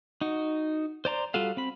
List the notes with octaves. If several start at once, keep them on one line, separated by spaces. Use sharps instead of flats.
D#4 F#4
C5 D5 A#5 C6
G3 F4 F#4 A4 F5
C4 B5